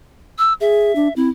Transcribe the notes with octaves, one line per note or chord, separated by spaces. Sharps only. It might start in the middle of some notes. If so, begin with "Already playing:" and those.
E6
G#4 E5
D4
C4 E4